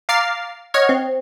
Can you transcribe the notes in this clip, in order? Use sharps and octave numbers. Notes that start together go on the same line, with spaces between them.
F5 A#5 D6 F6 A6 C7
C#5 D#5 F#5 C#6 F6 G#6
C4